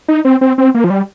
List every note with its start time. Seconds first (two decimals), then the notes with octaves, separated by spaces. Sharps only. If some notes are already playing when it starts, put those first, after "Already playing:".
0.08 D#4
0.25 C4
0.41 C4
0.58 C4
0.75 A#3
0.84 F3
0.90 G3